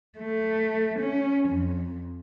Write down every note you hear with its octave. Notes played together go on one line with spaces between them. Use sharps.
A3
C#4
F2